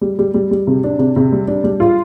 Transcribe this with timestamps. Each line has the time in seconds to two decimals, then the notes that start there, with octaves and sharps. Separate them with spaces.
0.01 G3
0.19 G3
0.34 G3
0.51 G3
0.67 C3
0.84 D4
0.99 C3
1.16 C3
1.32 G3
1.48 D4
1.64 G3
1.80 F4